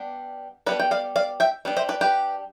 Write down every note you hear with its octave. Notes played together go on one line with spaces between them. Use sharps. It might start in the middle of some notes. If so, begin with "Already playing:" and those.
Already playing: G3 B3 D4
G3 B3 D4 B4 D5
G5
D5 F5
D5 F5
E5 G5
G3 B3 D4
C5 E5
B4 D5
G4 B4